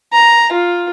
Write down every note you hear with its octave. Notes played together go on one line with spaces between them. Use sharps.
A#5
F4